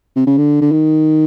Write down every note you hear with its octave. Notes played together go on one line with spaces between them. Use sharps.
C3
C#3
D3
D3
D#3